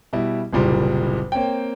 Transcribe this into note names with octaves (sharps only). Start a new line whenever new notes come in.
B2 G3 E4
F#1 C2 A#2 G3
A#3 C4 C#5 G5